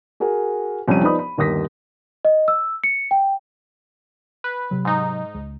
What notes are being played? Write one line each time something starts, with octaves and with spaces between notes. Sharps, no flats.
F#4 G#4 A#4
C2 F2 C#4 G#5 D#7
F3 B3 D#4 D5 B5 D#6
B5
G1 D#2 A#4 D#6 A#6 B6
D#5
E6
C#7
G5
B4
C3 F#3
G#2 D#4
C#2